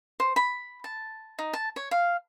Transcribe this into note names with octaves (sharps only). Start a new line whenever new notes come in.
C5
B5
A5
D#4
A5
C#5
F5